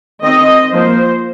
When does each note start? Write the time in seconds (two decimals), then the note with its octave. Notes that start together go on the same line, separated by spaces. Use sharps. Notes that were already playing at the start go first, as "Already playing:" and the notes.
0.23 D#3 C4 D#5
0.71 F3 A#3 C5